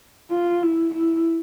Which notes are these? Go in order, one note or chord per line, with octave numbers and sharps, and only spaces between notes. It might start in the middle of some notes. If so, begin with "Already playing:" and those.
F4
E4
E4